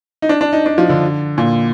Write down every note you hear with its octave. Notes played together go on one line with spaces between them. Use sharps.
D#4
D4
D4
D#4
D4
F3
D3
A#2